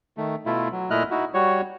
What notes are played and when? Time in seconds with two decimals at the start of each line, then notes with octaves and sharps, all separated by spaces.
0.17 D#3 A3
0.46 B2 A3 E4 F4
0.72 F#3
0.90 A#2 A3 E4 D#5 F6 F#6
1.11 D#4 E4 F#4
1.34 G3 F#4 C#5